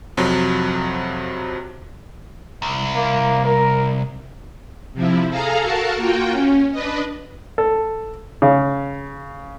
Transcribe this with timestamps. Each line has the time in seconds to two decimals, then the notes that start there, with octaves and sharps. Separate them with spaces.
0.17 F2 C3 F3 F#3
2.62 C2
2.95 A#3
3.45 A#4
4.94 C3 F3 E4
5.30 G#4 A4 F5 A#5
5.63 F#4 A4 A#4 F5 A5
5.97 A#3 F4 F#4 G5
6.31 C#4
6.71 D4 B4 D#5
7.58 A4
8.42 C#3